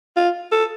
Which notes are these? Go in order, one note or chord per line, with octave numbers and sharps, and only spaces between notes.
F4
A4